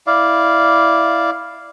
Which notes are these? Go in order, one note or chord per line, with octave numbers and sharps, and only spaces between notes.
E4 D5 F5